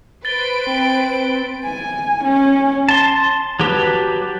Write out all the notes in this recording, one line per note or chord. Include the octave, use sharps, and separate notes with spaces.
B4 C5 A6 D7 G7
C4 G5
G#5
C#4
A5 C6
F#3 G4 B4 A5